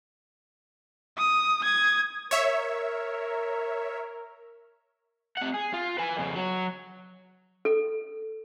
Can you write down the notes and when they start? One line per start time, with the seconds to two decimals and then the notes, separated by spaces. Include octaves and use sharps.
1.18 D#6
1.63 D#6 G#6
2.31 A#4 C#5 E5
5.37 C3 F#5
5.54 G#4
5.73 F4
5.98 B4 G#5
6.16 F2 C#3
6.35 F#3 F#4
7.65 A4